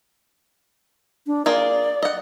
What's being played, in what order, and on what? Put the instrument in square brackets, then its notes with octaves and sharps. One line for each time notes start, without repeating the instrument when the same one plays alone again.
[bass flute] D4
[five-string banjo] A#3 F4 G#4 [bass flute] D5
[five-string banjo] D#5 F#5